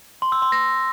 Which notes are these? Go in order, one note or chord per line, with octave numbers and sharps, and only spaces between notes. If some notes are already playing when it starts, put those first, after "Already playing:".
C6
E6
C6
A#6